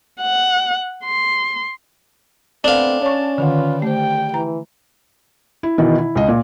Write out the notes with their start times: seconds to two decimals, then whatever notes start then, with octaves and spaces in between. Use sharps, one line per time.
0.21 F#5
1.04 C6
2.64 A3 B3 C4 D4 F5
3.02 C#4 C#5 A5 C#6
3.38 D3 D#3 F4 B4 F#5
3.82 A3 G4 C5 G5
4.34 E3 A#5
5.63 E4
5.78 B2 D#3 E3 E4
5.98 E4
6.16 C#2 D#5
6.28 A#2